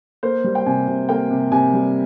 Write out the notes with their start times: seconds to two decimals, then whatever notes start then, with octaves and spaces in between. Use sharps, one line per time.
0.23 A#3 C5
0.44 G3
0.55 G5
0.66 C3 G#5
0.88 C3
1.09 A#3 G5
1.31 C3
1.52 C3 G#5
1.73 G3